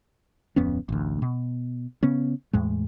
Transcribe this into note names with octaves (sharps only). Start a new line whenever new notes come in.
D1 F2 B3 C#4
A1 D2
B2
C#3 B3 C#4
E2 A2 G#3